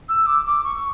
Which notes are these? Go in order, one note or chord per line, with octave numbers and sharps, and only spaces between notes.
E6
D6
D6
C#6